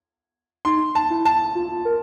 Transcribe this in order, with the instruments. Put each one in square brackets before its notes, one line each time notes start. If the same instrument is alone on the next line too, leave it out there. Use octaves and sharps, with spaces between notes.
[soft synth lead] D#4 [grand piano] C6
[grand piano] A5
[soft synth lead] E4
[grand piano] A5
[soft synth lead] F4
A#4